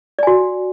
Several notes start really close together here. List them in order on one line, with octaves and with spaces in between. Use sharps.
D5 G#5 F#4